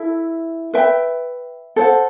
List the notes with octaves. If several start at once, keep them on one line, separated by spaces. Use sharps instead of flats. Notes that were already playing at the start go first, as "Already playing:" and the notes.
Already playing: E4 A4 E5
B4 E5 G5
A4 C5 F#5